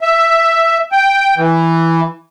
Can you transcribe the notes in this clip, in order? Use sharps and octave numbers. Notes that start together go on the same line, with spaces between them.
E5
G5
E3